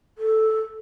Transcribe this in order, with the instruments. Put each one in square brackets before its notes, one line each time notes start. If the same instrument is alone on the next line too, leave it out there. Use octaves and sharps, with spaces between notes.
[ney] A4